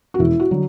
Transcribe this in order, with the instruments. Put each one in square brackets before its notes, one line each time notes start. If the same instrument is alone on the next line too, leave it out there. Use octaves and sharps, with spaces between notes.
[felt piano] F#4
E1 E4
F#4
D3 F#3